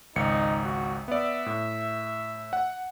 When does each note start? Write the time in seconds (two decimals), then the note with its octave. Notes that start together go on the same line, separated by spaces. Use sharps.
0.16 G#1 C#2 D#4 C#7
0.64 F#4
1.08 B3 D5 E5
1.46 A2
2.53 F#5